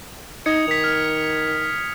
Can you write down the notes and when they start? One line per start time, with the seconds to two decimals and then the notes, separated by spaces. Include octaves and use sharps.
0.46 D#4 D#6 G#6 C#7
0.68 D#3 B6 F7
0.84 F6